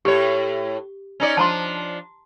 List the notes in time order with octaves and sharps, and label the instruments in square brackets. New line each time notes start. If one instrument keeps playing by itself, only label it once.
[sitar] A2 C#5 [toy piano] G4
[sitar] C#4 D#4 D5
[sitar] F3 D4 F4 [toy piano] A5 A#5 C6